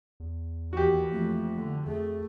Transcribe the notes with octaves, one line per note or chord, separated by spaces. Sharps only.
E2
D#2 E3 F#4 G4
F2 A3 A#3
D3
F2 A3 G#4